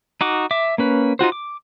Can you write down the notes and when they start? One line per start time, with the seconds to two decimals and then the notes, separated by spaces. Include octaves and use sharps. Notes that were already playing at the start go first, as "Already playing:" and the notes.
0.21 D#4 F#4 D6
0.51 E5 D6
0.78 A#3 C#4 B4
1.19 D#4 F4 F#4 C5
1.32 D6